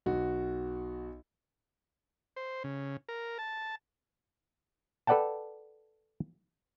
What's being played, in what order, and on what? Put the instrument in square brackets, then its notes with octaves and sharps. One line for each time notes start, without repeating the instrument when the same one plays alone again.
[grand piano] B1 F#4
[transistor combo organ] C5
C#3
A#4
A5
[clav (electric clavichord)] A4 B4 D5 F#5 G5 A5